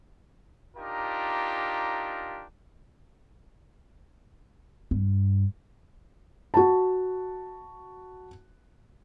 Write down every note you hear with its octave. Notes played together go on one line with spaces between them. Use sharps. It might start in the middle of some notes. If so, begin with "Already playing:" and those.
D4 D#4 F4 G4 A#4
G2
F#4 A5